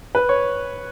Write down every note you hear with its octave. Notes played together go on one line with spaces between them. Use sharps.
B4
C#5